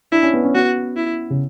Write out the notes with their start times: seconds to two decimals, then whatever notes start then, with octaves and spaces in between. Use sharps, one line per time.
0.12 D4 E4
0.23 C#4
0.33 B3
0.44 C#4
0.55 B3 F#4
0.96 E4
1.30 C#3